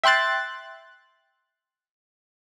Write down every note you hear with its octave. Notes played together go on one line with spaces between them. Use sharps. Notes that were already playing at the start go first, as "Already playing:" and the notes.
E5 G5 C6 F#6 A6